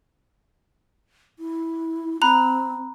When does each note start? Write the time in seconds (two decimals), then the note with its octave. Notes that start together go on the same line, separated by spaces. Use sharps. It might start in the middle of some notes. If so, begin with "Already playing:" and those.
1.39 E4
2.22 C4 A#5 B5 F#6